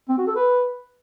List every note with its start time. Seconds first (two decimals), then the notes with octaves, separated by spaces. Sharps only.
0.09 C4
0.18 F#4
0.27 A4
0.36 B4